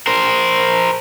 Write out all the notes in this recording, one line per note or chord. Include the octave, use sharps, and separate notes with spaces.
A#4 C5